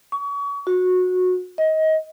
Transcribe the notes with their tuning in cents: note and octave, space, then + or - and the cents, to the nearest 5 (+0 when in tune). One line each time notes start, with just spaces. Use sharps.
C#6 +35
F#4 -20
D#5 +25